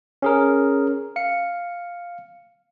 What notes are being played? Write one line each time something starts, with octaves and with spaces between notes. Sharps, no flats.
C#4 G#4 A#4
F5 C#7